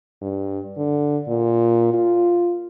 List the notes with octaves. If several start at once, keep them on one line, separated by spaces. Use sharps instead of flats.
G2
D3
A#2
F4